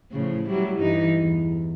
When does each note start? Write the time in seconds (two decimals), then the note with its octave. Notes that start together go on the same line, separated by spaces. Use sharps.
0.12 A2 C#3 F3
0.47 F#3 G3 E4
0.79 G2 E3 D#4
1.18 E2